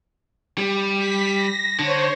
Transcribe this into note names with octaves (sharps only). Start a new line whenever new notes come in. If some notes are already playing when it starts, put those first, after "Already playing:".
G3
B6
A#6
D3 C5 C#5